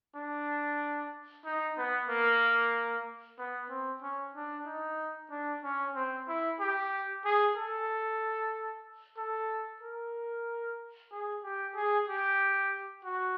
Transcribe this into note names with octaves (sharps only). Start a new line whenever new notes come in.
D4
D#4
B3
A#3
B3
C4
C#4
D4
D#4
D4
C#4
C4
E4
G4
G#4
A4
A4
A#4
G#4
G4
G#4
G4
F#4